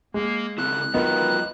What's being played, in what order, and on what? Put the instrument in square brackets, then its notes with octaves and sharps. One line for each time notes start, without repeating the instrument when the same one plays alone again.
[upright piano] G#3 [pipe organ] A#3
[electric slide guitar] C#3 C4 E4 [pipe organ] F#6
[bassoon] D#3 [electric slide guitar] F#3 F4 B4 [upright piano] B3